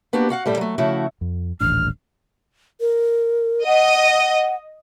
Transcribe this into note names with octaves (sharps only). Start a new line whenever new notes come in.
A#3 B3 D4 F#4 G4
F#4 F5 F#5
A2 G3 A4
F#3 A3
C#3 F3 A3 E4 F#4
F2
D#1 A1 D4 F6
A#4
D#5 F#5